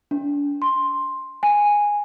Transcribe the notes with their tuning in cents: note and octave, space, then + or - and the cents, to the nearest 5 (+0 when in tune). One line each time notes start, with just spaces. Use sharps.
D4 -35
C6 +5
G#5 -10